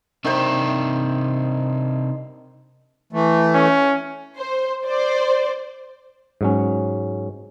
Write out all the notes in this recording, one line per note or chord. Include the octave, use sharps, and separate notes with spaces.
C3 D#3 D4 C5 E5
E3 A3
C#4
C5
C5 D5
G#2 F#3 C#4